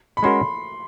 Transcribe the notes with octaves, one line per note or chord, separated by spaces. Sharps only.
B5
G#3 C#4 F#4 A#4 C6